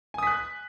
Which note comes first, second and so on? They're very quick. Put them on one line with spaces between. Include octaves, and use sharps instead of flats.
G#5 D#6 B6 F#6